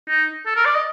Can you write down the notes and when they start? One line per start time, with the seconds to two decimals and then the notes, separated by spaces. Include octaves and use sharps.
0.08 D#4
0.46 A4
0.56 A#4
0.65 D5
0.75 D#5